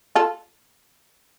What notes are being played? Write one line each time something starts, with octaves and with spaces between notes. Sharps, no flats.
F4 A4